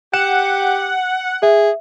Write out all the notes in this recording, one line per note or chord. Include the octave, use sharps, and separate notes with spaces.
G4 F#5 E7
G#4 E5